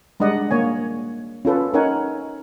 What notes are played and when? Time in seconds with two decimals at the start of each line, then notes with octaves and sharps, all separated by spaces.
0.20 G3 G#3 D4 D5 D#5 F#5
0.51 A#3 C#5 G#5
1.45 C#4 F4 A4 B4
1.74 C#4 D#4 A#4 C#5 F#5 G#5